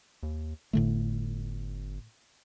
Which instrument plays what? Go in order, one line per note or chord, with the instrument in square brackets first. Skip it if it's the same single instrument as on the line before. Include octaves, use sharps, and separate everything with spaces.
[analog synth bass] D#2
[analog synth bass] G1 [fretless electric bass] A2 D3 A3